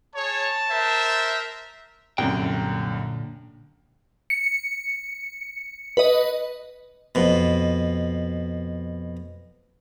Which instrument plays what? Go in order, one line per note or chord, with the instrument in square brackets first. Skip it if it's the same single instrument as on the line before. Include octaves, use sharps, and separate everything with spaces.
[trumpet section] G#4 C#5 [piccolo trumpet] A5
[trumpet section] A#4 C5 E5
[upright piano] C2 F#2 [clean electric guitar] A#2 D3 G5
[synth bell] C#7
B4 D#5
[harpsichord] F2 B2